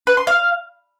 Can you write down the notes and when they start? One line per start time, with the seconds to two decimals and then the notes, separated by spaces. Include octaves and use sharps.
0.07 B4
0.17 C6
0.27 F5